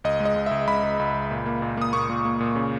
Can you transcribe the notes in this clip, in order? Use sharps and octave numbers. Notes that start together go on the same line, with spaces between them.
C#2 D#5
G#3
D#5
C#2
C#2 E5
C#2 B5
C#2
C#2
C#2
A#2
A#3
A#2
A#3 D#6
A#2 C#6
A#2
A#3
A#2
C#3